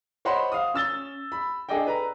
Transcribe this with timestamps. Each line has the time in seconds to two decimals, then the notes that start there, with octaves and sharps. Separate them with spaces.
0.25 C5 C#5 D#5 F#5 B5 C6
0.52 F5 D#6
0.74 C#4 E6 A6 G7
1.32 B5
1.69 D4 G#4 A4 D5 D#5 G5
1.87 B4 A#5